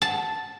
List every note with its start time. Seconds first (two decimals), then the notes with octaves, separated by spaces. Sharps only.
0.02 A5